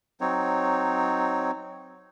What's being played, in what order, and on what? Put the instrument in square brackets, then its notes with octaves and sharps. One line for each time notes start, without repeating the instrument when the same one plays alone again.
[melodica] F#3 C4 D#4 C#5